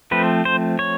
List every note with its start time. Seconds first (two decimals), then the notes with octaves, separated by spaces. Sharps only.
0.11 F3 A3 C4 B4
0.45 C5
0.79 C#5